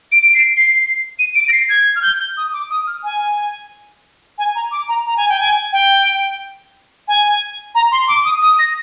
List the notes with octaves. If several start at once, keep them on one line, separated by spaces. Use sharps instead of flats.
D7
D7
C7
C7
C7
D#7
D7
A#6
C7
G#6
F6
G6
D#6
D6
D#6
F6
G#5
G#5
A#5
D6
A#5
A#5
G#5
G5
G#5
G5
G#5
A#5
C6
D6
D#6
D#6
A#6